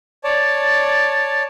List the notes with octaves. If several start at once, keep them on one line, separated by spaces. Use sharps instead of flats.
C#5 D5 A5